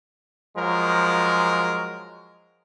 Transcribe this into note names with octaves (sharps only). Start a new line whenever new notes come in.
F3 F#3 G#3 A#4